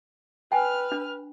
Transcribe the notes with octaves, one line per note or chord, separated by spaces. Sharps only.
B4 G5 G#5 F6
D4